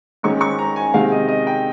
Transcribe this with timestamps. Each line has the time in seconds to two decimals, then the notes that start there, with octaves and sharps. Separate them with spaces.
0.23 G#2 D#3 G#3 C#4 C#6
0.41 C#6
0.59 A#5
0.76 G#5
0.94 C3 D#3 G#3 F5
1.12 D#5
1.29 D#5
1.47 G5